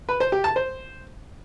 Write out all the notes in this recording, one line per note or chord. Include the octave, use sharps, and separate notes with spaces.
B4
C5
G4
A5
C5